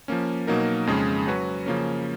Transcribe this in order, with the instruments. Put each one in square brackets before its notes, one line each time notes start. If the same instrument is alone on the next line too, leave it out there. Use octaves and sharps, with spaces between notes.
[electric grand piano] F3 A#3 C#4
B2 F#3 A#3 D#4 A#4
F2 C#3 G#3 C#4 G#4
F#3 C#4 F#4 B4
C#3 F3 A#3 C#4